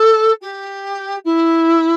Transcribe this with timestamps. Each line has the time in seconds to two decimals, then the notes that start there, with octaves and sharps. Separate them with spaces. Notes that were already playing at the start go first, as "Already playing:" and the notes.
Already playing: A4
0.41 G4
1.24 E4